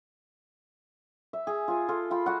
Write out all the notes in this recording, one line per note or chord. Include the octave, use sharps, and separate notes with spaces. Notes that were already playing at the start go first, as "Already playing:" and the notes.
E5
G#4
F4 G#5
F4 A4
F4 G5 B5
F#4 F#5